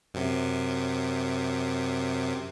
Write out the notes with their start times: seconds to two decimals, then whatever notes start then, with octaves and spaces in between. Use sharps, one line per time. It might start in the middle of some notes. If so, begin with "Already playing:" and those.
0.14 F#2 C3